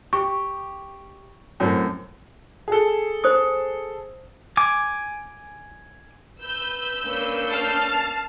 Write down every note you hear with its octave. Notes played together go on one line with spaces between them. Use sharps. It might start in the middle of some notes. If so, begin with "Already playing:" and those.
G4 C#6
F#2 A2 C4
G#4 A4
C5 D#6
G#5 D6
B4 E6 G6
A#3 C#4 D4
A5 F6 C7